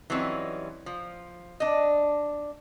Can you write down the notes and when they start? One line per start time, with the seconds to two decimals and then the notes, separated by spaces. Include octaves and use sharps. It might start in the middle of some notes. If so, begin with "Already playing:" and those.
0.10 E3 F#3 G3 C4 C#4 D#4
0.86 F3
1.60 D4 D#5